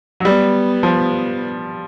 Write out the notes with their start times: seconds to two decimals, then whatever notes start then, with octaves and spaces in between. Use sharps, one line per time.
0.20 F#3
0.25 G3 B3
0.83 F3